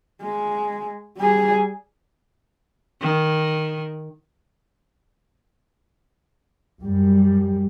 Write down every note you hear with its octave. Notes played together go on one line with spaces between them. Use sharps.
G#3
G3 G#4
D#3
F#2 G3